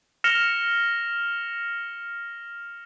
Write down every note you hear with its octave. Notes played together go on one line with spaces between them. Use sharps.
F6 A#6 C#7 E7 F7 G7